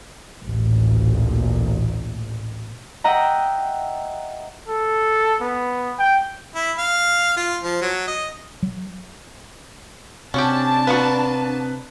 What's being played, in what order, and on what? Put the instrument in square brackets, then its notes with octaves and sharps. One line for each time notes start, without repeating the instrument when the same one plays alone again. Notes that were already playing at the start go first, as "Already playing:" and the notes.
[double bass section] A1 D2 A#2
[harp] D#5 E5 F#5 G5 A#5
[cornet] A4
B3
G5
[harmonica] E4
F5
F4
F3
F#3
D#5
[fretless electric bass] F#3
[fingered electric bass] C3 [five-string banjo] C#4 F#4 G4 [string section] D4 A5
[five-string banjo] A#3 B3 F#4 [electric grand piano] B4